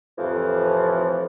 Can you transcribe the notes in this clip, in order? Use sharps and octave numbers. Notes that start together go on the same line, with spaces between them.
F2 A2 C3 E3 F3